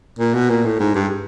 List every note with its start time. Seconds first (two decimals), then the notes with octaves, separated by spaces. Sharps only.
0.19 A#2
0.35 B2
0.50 A#2
0.65 A2
0.80 G#2
0.95 G2